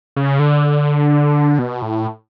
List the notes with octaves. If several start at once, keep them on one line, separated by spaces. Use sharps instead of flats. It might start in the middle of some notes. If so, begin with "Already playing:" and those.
C#3
D3
B2
A2